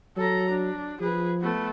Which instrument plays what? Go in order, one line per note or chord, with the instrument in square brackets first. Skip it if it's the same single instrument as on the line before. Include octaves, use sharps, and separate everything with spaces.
[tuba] F#3 [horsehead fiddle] A4 A#5
[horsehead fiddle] D4
[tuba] F3 [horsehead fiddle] G#4 B4
[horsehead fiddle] A3 B3